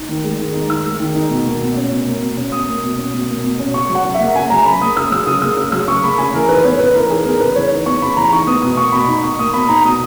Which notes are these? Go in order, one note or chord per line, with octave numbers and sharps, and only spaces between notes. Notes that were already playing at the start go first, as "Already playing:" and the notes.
Already playing: D#4
D#3
G#3
D#3
D#4
D#3 E6
G#3
D#3
D#4
B2
A#3
B2
C#4
B2
A#3
B2
C#4
B2 D#6
A#3
B2
C#4
B2
A#3
B2
C#4
C#3 C#6
F#3
F#5
C#3
E5
A#3
C#3 G#5
F#3 A#5
C#3 B5
A#3 D#6
C#3 E6
F#3 E6
C#3 D#6
A#3 E6
C#3
F#3 E6
C#3 C#6
A#3 B5
C#3 G#5
E3 A#4
D#4 B4
B3 C#5
C#3 B4
E3 A#4
D#4 G#4
B3 A#4
C#3 B4
E3 C#5
D#4
B3 C#6
C#3 B5
E3 A#5
D#4 C#6
B3 D#6
B2 D#6
A#3 C#6
B2 B5
D#4
B2 C#6
A#3 D#6
B2 B5
D#4 A#5
B2 D#6